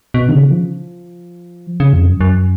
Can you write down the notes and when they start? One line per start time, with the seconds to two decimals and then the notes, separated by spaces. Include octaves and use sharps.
0.14 B2
0.29 D#3
0.33 C#3
0.51 F3
1.80 C#3
1.93 F2
2.08 F#2
2.21 F#2